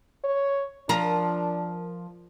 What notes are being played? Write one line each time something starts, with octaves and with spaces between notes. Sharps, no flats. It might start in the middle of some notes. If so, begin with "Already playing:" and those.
C#5
F3 D4 A#4